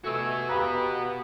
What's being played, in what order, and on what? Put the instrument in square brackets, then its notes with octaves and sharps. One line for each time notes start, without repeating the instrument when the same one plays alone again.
[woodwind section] C3 G#5 E6 [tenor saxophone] A3 [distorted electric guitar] F#4 B4
[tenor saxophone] B3 [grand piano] G4 F5 A#5 [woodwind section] B5